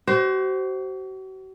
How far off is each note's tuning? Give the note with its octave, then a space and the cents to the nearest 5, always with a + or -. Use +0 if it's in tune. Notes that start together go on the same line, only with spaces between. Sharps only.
F#4 +45 C5 +0